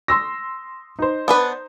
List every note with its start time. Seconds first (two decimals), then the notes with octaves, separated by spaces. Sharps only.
0.08 C6 E6 A#6
0.99 D#4 C5
1.28 B3 D4 B4